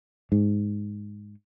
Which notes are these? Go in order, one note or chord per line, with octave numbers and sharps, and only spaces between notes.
G#2